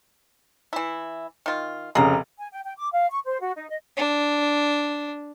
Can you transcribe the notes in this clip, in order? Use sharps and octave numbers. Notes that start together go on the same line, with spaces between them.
E3 E4
D#3 F4
F1 C#3 G#4 A#5
G#5
G5
G5
D6
F5
C#6
C5
F#4
D#4
D#5
D4